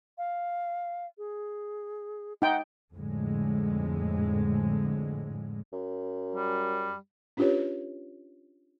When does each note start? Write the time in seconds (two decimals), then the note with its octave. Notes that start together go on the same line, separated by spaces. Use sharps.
0.18 F5
1.18 G#4
2.42 D#4 F#5 G5
2.93 F2 A2 D3 G#3
5.73 F#2
6.35 G3
7.37 C#4 D4 F4 G4 B4 C#5